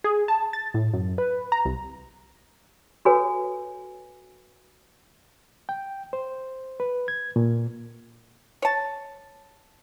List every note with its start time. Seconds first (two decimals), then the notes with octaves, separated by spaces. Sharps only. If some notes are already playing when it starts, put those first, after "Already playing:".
0.04 G#4
0.28 A5
0.53 A6
0.74 A2
0.93 F#2
1.18 B4
1.52 A#5
1.65 C2
3.05 F#4 A4 B4 C#5 G#5
5.69 G5
6.13 C5
6.80 B4
7.08 G#6
7.36 A#2
8.62 C#5 A5